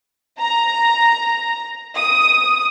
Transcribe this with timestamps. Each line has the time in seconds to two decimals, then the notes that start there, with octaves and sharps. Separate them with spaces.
0.39 A#5
1.97 D#6